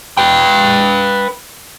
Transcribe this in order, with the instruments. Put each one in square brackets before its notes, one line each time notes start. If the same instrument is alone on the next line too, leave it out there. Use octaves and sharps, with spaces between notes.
[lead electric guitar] B4 G5